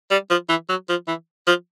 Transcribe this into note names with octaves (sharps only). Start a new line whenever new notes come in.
G3
F3
E3
F#3
F3
E3
F3